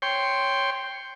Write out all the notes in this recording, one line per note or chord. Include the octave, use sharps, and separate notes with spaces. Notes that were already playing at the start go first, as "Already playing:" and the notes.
C#5 G5 C6